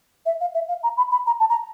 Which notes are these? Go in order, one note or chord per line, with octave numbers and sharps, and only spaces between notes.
E5
F5
E5
F5
A#5
B5
B5
A#5
A5
A#5